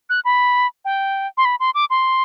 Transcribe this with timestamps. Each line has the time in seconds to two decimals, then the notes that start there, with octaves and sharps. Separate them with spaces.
0.10 F#6
0.25 B5
0.85 G5
1.37 C6
1.45 B5
1.60 C6
1.75 D6
1.90 C6